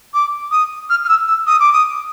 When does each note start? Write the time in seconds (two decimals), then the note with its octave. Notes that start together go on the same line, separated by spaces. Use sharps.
0.14 D6
0.51 D#6
0.90 F6
1.05 F6
1.09 E6
1.28 E6
1.47 D#6
1.60 D6
1.73 D#6